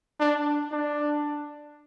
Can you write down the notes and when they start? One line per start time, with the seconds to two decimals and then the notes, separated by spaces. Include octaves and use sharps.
0.20 D4
0.72 D4